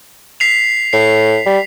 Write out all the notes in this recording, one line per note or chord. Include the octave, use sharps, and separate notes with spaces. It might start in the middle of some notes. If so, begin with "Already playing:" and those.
B6 C7 F7
A2 C7
G3